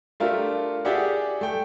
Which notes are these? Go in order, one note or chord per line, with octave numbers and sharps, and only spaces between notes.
A3 D4 F4 G4 A#4 E5
G4 G#4 D5 E5 F#5
A3 G5